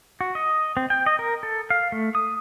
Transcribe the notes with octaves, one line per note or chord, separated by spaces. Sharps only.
F#4
D#5
C4
G5
D#5
A#4
A4
F5
A3
D#6